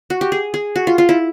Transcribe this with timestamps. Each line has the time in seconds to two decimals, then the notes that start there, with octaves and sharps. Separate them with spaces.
0.10 F#4
0.21 G4
0.32 G#4
0.54 G#4
0.76 F#4
0.87 F4
0.98 F4
1.09 E4